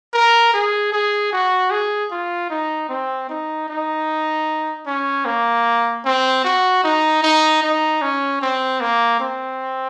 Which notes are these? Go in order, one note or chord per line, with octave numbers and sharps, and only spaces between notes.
A#4
G#4
G#4
F#4
G#4
F4
D#4
C4
D#4
D#4
C#4
A#3
C4
F#4
D#4
D#4
D#4
C#4
C4
A#3
C4